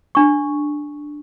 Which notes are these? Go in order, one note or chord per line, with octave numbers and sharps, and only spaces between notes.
D4 C#6